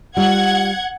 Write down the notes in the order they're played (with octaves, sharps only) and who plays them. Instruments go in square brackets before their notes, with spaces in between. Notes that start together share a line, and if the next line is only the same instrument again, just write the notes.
[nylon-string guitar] G3 F4 [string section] F#5 G#6